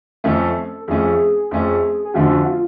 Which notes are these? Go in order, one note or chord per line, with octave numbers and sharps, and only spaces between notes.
F2 F3 A3 C#4 A4
F2 F3 A3 C#4 G#4
F2 F3 A3 C#4
G#4
F2 D3 F3 A3 C#4 F#4
F#4
F4